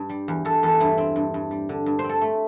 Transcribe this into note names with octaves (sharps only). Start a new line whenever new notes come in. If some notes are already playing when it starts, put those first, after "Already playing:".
Already playing: G2
G3
E2
E2 A4
E2 A4
G2 E4
C4
G2
G2
G3
D3
G2
C5
C4
A4
A3